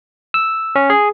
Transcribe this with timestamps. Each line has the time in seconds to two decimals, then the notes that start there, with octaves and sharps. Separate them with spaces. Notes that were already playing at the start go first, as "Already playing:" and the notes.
0.34 E6
0.75 C#4
0.90 G#4